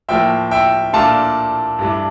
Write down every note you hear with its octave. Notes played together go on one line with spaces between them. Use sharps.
A2 F3 A#3 E5 G5
E5 G5
A#2 A3 D4 F5 A5
G2 E3 A3 D4